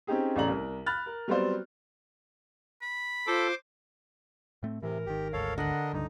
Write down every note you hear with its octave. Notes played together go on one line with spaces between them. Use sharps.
C4 C#4 D#4 G4 G#4
A1 C#3 A4 D5 A#5 F#7
C2 A#4
B5 F6 F#6 A6
A#4
F#3 G3 B3 C4 C5 D5
B5
F4 A4 C5 D6
A2 A3 C4
A2 C3 E3 A#4
G#1 D#3 G4
G#1 D2 G#2 A4 C#5 F5
D3 D4 A#4 D#5 F#5 B5
C#2 G2 D#4